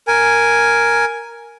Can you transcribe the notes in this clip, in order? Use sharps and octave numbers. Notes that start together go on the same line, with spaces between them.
A#4 G#5